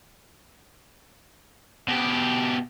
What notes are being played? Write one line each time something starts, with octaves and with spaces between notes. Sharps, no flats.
B2 G4